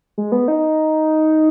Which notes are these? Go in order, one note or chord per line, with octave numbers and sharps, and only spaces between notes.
G#3
B3
D#4